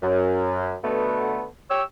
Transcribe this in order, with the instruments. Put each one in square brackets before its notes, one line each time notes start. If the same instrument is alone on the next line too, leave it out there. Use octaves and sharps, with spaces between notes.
[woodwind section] F#2
B2 D3 A3 B3
G4 C#5 E6